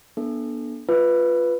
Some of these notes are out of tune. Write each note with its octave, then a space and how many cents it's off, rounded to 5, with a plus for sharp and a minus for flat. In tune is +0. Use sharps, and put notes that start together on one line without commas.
B3 -40 D4 +0 A4 -15
F4 +0 B4 +0